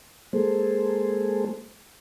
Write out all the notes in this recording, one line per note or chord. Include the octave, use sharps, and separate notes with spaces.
G#3 A#3 G#4 A4 C5